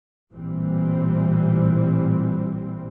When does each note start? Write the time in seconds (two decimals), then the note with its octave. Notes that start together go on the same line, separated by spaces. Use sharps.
0.32 A1 A#2 E3 G3 C4